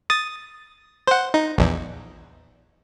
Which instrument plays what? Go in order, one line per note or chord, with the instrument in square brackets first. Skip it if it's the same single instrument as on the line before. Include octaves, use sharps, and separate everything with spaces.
[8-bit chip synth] D#6 A6
C5 F#5
D#4
A#1 E2